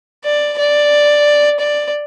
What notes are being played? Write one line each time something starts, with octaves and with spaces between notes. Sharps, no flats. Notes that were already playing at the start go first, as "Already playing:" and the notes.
D5
D5
D5